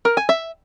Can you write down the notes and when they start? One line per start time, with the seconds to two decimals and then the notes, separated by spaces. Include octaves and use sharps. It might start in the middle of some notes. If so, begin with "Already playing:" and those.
0.05 A#4
0.17 G#5
0.29 E5